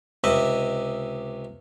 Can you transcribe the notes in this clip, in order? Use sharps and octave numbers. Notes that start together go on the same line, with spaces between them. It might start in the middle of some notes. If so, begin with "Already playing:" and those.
C#2 C3 D#5 E5